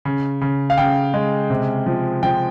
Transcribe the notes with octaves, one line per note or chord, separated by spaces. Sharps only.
C#3
C#3
F5
C#3 G5
G#3
C3
F3
F3 G5